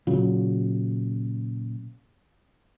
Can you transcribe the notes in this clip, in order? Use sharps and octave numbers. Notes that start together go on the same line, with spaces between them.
A#2 C#3 F#3